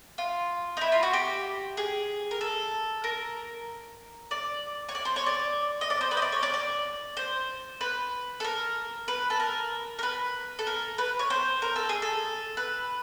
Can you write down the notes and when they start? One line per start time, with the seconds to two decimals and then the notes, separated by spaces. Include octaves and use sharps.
0.18 F4
0.77 D#4
0.81 E4
0.92 F4
1.03 F#4
1.13 G4
1.77 G#4
2.31 A#4
2.41 A4
3.04 A#4
4.31 D5
4.89 C#5
4.95 D5
5.05 C5
5.16 C#5
5.26 D5
5.81 D#5
5.90 D5
6.01 C5
6.11 B4
6.17 D#5
6.22 D5
6.32 C#5
6.43 D5
6.54 D5
7.17 C5
7.81 B4
8.40 A4
8.44 A#4
9.08 B4
9.30 A4
9.40 A#4
9.99 A#4
10.03 B4
10.59 A4
10.67 A#4
10.98 B4
11.19 C#5
11.30 C5
11.62 A#4
11.76 A4
11.89 G#4
12.02 A4
12.57 B4